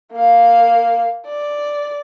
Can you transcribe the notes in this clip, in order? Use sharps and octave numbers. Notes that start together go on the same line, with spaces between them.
A#3 F5
D5